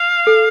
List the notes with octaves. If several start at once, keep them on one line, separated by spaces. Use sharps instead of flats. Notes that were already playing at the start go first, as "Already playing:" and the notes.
Already playing: F5
A4